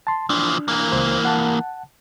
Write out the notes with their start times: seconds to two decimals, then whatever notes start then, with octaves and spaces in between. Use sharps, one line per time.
0.07 A5 C6
0.30 E3 F3 D4
0.68 E3 A#3
0.92 C#2 C5
1.25 F#5 A5